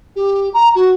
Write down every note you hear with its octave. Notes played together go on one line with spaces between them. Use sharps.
G4
A#5
F#4